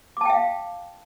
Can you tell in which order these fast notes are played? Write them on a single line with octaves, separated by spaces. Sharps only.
D6 A5 G5 E5 F5